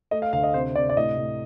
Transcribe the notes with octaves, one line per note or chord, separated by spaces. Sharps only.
A3 D#5
F5
D2 F5
D#5
C3 C5
C3 D5
D5
A2 D#5
A2